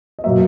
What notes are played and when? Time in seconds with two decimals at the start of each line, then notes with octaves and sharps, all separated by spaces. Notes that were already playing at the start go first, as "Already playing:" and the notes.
0.19 D#5
0.24 B2 F#3 A#3 E5